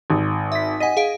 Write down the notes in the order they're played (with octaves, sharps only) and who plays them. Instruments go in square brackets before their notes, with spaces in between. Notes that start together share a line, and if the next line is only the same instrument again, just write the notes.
[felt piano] G#1
[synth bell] E5 B6
[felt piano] D#5 G#5 [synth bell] F#5 B6 D#7
[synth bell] G#4 F5 D7